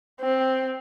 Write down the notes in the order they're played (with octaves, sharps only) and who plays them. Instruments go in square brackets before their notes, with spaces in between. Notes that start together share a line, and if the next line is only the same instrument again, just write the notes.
[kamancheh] C4